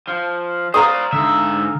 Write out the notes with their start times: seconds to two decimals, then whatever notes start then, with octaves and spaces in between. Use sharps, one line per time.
0.07 F3
0.74 C5 D5 F5 A#5 D#6
1.13 G#2 D3 E5